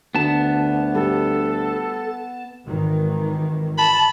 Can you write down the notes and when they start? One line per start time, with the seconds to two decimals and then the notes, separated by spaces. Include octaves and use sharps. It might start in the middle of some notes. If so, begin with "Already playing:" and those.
0.15 D2 D3 B3 A5
0.94 G3 A4
2.66 G#1 D#3 E3
3.78 A5 B5